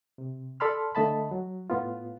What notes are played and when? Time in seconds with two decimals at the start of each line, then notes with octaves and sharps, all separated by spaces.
0.18 C3
0.60 A4 D5 A5 B5 C6 F6
0.95 D3 A3 D#5 A5 B5
1.31 F#3
1.70 A2 B3 F4